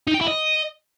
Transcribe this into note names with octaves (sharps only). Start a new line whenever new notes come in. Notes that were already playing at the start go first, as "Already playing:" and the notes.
D#4
G5
E4
D#5